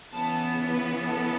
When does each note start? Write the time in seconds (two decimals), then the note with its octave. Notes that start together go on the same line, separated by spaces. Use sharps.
0.12 C#3 E3 B3 A5
0.73 B4
1.04 A4